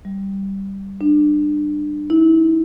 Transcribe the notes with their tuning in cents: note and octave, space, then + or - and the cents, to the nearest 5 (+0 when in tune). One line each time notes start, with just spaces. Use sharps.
G3 -5
D4 +25
E4 -30